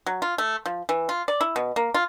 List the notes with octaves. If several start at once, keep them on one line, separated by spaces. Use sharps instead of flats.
F#3
F4
A3
F3
E3
F4
D5
E4
B2
A#3
F4